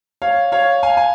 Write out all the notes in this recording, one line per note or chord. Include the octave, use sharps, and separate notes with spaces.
C#5 F5
C#5 F5
F5 G#5
G#5